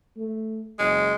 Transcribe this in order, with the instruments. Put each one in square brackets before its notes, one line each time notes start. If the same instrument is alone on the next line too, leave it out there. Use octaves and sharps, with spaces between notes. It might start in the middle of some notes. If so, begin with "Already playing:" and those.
[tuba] A3
[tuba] F#1 [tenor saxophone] G#3